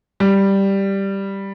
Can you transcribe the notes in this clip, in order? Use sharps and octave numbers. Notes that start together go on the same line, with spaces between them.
G3